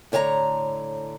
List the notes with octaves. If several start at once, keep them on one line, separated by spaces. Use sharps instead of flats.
A2 D3 C#5 A5 A#5